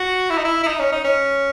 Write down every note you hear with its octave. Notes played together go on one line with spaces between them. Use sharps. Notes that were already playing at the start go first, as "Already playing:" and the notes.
Already playing: F#4
E4
D#4
E4
E4
D#4
C#4
D#4
C#4